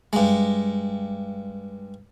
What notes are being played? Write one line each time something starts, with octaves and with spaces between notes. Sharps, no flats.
G2 G#3